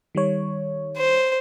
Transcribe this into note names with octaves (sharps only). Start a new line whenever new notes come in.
D#3 G3 C#5
C5